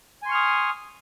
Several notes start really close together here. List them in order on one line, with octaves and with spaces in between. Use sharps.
G#5 C6 C#6 F6 D#6